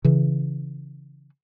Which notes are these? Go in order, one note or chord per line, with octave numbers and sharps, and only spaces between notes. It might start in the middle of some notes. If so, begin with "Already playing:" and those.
C#3 E3